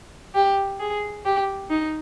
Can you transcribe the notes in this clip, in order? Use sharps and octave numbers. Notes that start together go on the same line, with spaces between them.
G4
G#4
G4
D#4